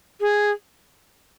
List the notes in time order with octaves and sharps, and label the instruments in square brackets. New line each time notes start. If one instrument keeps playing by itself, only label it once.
[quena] G#4